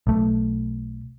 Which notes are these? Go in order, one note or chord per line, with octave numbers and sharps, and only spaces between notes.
B1 A3